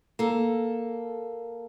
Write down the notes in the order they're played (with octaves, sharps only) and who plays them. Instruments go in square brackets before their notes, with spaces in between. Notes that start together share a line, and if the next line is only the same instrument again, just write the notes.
[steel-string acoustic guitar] A#3 A4